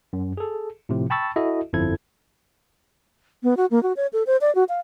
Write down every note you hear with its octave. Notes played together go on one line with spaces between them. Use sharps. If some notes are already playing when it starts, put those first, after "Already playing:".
F#2
G#4 A4
A2 C3 F3
G5 A5 B5 C#6 E6 A6
E4 F#4 A4 D#5 E5
G1 F2 F3 E4 A4 G#6
B3
F#4
A#3
F#4
C#5
A4
C5
D5
F#4
F5